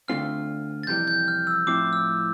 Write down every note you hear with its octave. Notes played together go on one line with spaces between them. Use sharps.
D2 D3 A3 C4 F4 F6
A6
F2 C3 E3 G3 G6
G6
F6
E6
A2 F3 C4 E4 D6
E6